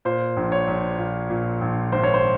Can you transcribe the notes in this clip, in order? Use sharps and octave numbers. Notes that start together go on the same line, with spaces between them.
A#2 C5
A#1
C#5
A#1
A#2
A#2
A#1
G#1 C5
C#5
C5